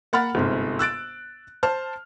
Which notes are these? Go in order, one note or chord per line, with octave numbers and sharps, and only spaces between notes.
A#3 F#5 B5 F6 A6
G1 G#2 C3
E6 F#6 A6 D7
C5 A5 F6